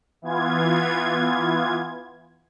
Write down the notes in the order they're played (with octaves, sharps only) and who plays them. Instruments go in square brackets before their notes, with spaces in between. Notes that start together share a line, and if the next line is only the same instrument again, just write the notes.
[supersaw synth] E3 B3 F4 G#6